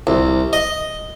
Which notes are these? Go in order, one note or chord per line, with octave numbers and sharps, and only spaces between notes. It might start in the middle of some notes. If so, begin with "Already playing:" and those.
C2
D#5